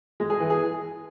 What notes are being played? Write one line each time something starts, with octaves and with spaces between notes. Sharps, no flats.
G#3
G#4
E3
G#4